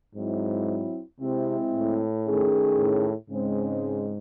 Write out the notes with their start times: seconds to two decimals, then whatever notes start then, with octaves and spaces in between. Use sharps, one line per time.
0.15 G#2 F#3 C4 E4
1.20 C3 G#3 C4 E4
1.73 A2
2.25 D#3 A3 C#4 G#4
2.77 A2
3.30 G#2 C#3 G#3 C4